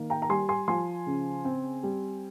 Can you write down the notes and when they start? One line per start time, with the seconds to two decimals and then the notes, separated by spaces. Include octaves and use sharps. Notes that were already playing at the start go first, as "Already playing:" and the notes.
Already playing: D#3 A#3
0.10 G5 A#5
0.22 A#5
0.29 G3 G#5 C6
0.49 G#5 C6
0.68 F3 G#5 C6
1.07 C#3
1.45 C4
1.83 G3